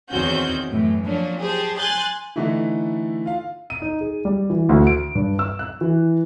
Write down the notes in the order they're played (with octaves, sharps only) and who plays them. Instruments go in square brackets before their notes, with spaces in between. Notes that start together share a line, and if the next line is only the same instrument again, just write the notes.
[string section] E2 D#3 C4 C#4 F#4 G6
F#2 A2 E3
F3 F#3 A#3 C#4 D4
G4 G#4 C5 A5
G#5 C6 F#6 G6 A6
[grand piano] D3 E3 A3 D#4 E4
F4 F5
D#7
D#4
G#4
G3
E3
D2
D7
G2
E6
F#6
E3